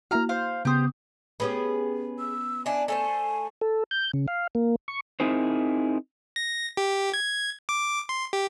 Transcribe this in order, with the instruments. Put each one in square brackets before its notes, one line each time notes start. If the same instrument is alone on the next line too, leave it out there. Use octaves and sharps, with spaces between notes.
[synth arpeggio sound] A#3 E4 F#4 [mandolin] A#5 F6
[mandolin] C5 F5
[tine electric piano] C#3 B3 D#6 [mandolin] G4 C5
[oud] B3 C#4 G4 [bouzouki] G#4
[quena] E6
[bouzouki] D4 E4 [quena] G#5
[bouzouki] A3 A4 C5 [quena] G#5
[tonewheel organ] A4
G6
C#3
F5
A#3
C#6
[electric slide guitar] C4 D#4 E4 G#4 A#4 C5
[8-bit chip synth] A#6
G4
G#6
D6
C6
G4